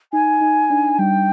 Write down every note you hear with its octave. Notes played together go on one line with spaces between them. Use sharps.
D#4 G#5
D#4
D4
G3 G5